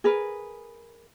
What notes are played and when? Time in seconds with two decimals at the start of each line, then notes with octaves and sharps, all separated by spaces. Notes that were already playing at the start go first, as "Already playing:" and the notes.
0.04 G#4 A#4 B4